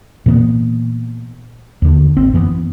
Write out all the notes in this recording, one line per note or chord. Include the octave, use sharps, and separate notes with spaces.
A#2 E3 A#3 B3
D#2 D3
G#1 C4
F#2 E3 B3